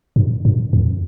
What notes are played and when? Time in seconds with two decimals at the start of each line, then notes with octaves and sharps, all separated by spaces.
0.16 G2
0.45 G2
0.73 F2